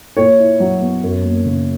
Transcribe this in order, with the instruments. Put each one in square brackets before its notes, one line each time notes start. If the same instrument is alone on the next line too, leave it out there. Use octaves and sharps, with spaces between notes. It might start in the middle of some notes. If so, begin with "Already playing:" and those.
[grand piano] A#2 C#5
E4
F#3
B3
F#2
A#3
C#3